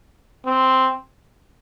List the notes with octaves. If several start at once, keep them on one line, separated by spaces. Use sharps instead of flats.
C4